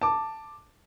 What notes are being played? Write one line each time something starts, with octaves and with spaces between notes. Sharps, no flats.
A5 D6